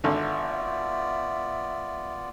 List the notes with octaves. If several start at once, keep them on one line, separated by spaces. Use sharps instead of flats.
G#1 D3 B3 F4 D5 E5